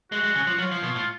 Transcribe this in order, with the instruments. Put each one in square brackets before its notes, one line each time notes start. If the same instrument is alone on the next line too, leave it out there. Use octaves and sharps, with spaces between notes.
[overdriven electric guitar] G#3 [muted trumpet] F#4
[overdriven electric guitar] G#3
C#3
F3
[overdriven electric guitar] F#3 [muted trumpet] F4
[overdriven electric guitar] F3
B2
A2